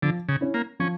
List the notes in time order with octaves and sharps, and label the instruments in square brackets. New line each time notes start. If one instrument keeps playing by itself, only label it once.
[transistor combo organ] D3 [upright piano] F3
[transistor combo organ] C#3
[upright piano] C#4 E4
[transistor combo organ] A#3
[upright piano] F3 [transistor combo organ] C#4